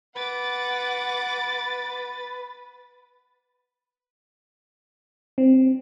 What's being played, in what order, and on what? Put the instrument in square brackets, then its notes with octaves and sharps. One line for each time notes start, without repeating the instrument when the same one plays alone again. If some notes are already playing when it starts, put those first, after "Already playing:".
[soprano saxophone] B4 [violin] F#5 D6 [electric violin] A6
[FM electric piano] C4